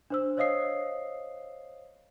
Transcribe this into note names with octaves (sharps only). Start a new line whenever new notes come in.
D4 C5 E6
C5 C#5 D#5 F5 D#6 C7